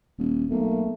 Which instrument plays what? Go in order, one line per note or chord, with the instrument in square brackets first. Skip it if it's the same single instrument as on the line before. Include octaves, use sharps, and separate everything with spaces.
[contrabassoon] D#1
[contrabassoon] B1 [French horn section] A3 A#3